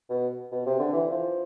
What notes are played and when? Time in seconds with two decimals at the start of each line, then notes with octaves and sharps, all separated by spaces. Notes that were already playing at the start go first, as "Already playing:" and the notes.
0.10 B2
0.52 B2
0.66 C3
0.80 D3
0.93 E3
1.11 F3